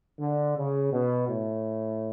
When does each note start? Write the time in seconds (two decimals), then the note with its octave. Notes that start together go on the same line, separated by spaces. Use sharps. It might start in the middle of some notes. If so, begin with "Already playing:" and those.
0.20 D3
0.57 C#3
0.92 B2
1.29 A2